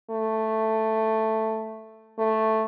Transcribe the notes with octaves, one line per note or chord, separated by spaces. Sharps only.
A3
A3